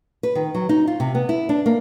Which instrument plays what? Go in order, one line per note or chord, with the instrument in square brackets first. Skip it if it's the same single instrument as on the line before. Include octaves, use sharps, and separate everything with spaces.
[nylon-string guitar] B4
D#3
F#3
D#4
F4
C3
B3
E4
D4
A#3